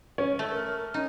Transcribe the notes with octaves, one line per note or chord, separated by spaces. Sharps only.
C#4
A3
A#4
C#4 D#4